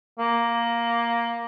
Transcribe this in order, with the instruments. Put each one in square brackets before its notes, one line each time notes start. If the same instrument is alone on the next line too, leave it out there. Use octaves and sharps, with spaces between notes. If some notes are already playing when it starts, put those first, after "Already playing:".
[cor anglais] A#3